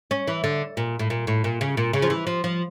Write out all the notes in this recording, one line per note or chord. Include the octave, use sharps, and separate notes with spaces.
C#4
E3
D3
A#2
A2
A#2
A2
A#2
C#3
A#2
C#3
F3
E3
F3
F3